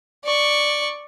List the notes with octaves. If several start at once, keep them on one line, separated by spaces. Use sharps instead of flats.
D5 C#6